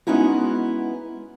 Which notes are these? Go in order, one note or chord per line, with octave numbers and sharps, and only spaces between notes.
G#3 B3 C#4 D#4 E4 F#4